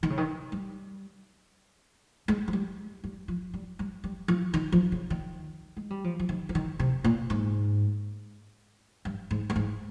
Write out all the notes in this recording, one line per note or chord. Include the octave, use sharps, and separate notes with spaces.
D#3
C#3
D#3
G3
G#3
F3
G3
G3
F3
G3
G3
G3
F3
D#3
F3
C#3
D#3
G#3
G3
F3
F3
D#3
F3
D#3
C3
A#2
G#2
G2
G#2
G2
G#2